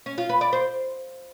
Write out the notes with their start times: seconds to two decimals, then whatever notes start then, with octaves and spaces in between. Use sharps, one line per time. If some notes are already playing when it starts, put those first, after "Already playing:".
0.06 C#4
0.18 F4
0.29 B4
0.41 D5
0.53 C5